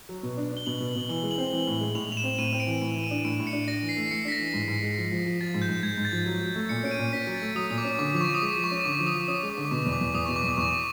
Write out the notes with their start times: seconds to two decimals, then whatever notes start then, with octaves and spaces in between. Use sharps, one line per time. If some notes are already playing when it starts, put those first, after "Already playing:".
0.09 F#3
0.23 B2
0.37 D4
0.52 D4 G7
0.66 B2 F#7
0.80 B2
0.95 B2
1.09 E3 G7
1.23 G#3
1.31 F#7
1.38 C4
1.53 E3
1.67 A2
1.81 G#3
1.95 A2 F7
2.09 A2 F7
2.17 E7
2.24 C4
2.38 A2 D#7
2.53 C4
2.60 D7
2.67 E3
2.82 A2 D7
2.96 E3
3.04 D#7
3.11 D4
3.25 A2 D7
3.39 A2
3.47 C#7
3.53 D4
3.68 D4 A#6
3.82 E3
3.89 C7
3.97 A3
4.11 A3 C#7
4.25 D4 B6
4.32 A#6
4.40 E3
4.54 G#2
4.68 G#2
4.83 G#3
4.97 F3
5.12 F3
5.26 F3
5.40 F3 A6
5.54 G#2
5.62 G6
5.69 G#2
5.83 G#2 G#6
5.98 G#2
6.05 A6
6.12 F3
6.26 F#3
6.41 F#3
6.56 A3
6.69 A#2 C#7
6.84 C#4 D7
6.91 D#7
6.99 A#2
7.13 C#4 B6
7.27 F#3
7.35 A6
7.42 A3
7.55 F#3 D#6
7.70 A#2 D#6
7.78 D6
7.84 C#4
7.98 D3 D6
8.13 F3 D6
8.21 C#6
8.27 F3
8.34 D#6
8.42 G#3 D6
8.56 F3
8.64 C#6
8.71 C#4
8.85 D3 D6
8.99 F3
9.07 D#6
9.14 F3
9.28 C#4 D#6
9.43 G#3
9.50 D6
9.57 D3
9.65 D6
9.71 B2 C#6
9.86 E2
9.92 D6
10.01 E2
10.14 E2 D#6
10.26 B2 C#6
10.36 D6
10.44 E2
10.49 D6
10.57 E2 C#6